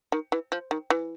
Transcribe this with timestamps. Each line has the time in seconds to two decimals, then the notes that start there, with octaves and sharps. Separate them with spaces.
0.12 D#3
0.32 E3
0.52 F3
0.71 D#3
0.90 E3